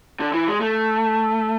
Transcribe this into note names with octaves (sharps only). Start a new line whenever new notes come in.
D3
E3
G#3
A3